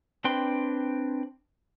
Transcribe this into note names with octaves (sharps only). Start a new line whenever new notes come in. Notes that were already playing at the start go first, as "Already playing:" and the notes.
C4 D4 B4 G5 C6